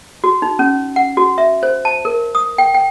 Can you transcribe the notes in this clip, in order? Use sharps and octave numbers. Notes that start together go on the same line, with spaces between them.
F#4
D#4
C#4
F#5
F#4
E5
C5
A5
A#4
D#6
G5
G5